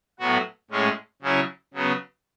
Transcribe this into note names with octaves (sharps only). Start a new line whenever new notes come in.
A2 F#3 B3 F#4
A2 G#3 C#4
C#3 F#3 C#4 E4
C#3 F#3 B3